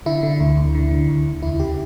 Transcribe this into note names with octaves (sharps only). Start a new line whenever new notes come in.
D3 E4
D3
D2
D2
D3
D3
D2
D2
E2 E4
C#3 G4